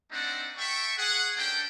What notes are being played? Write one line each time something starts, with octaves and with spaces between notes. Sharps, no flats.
A3 C4 D4 D#4 D5 F#5
A4 E5 G5 C#6
G#4 F#5
A#3 C#4 D4 A4 G5